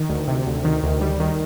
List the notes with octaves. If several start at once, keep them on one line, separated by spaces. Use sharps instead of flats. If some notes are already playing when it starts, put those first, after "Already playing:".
Already playing: D#3
D2
C3
D2
D#3
D2
G3
D#3